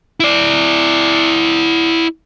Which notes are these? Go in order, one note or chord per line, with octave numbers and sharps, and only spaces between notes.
E4 D5